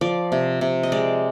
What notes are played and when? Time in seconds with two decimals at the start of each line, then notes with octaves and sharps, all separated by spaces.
0.01 F3 D5
0.32 C3
0.61 C3
0.83 D#5
0.92 G#3 D5